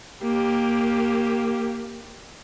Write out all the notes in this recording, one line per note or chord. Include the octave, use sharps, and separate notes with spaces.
A#3 G4